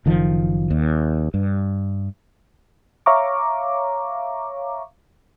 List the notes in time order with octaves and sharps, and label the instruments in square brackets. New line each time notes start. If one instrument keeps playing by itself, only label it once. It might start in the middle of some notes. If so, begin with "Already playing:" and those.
[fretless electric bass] F#1 D#3 F3
D#2
G2
[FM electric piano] C#5 E5 F5 A#5 C#6 D6